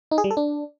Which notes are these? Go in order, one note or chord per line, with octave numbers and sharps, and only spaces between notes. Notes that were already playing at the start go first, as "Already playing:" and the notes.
D#4
G#4
G3
A4
D4